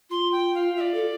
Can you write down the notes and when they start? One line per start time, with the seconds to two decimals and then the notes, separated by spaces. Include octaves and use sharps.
0.10 F4 C6
0.32 G5
0.55 F5
0.76 F4 D5 E5
0.94 A4